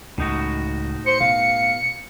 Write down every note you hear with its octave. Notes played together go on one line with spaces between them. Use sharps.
C#2 A2 D#4 F#4
C5 C#7
B2 F5